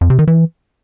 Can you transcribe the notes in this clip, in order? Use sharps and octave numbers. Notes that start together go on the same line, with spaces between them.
F2
C3
D#3
E3